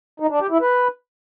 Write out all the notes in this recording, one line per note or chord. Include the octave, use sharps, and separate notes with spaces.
D#4
D4
G4
E4
B4